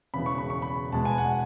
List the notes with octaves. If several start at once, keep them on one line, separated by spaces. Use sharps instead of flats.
E1 E2 C#3 B5
C#6
B5
C#6
B5
E2 B2 G#3 B3 A5
G#5
F#5